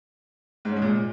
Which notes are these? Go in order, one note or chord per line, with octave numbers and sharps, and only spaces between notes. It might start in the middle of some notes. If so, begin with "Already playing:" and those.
G#2
C#4
G#3
A#2